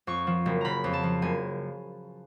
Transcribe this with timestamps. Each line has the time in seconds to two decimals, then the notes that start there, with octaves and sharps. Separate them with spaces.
0.07 F2 C#6
0.27 F3
0.46 F#1
0.61 C#3 A#5 B5
0.84 F2
0.93 A5
1.03 F3
1.22 F#1 G#5